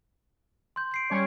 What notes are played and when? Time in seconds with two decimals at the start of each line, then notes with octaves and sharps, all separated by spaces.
0.76 C6 G6
0.92 G6 C7 D7
1.10 G3 C#4 C#5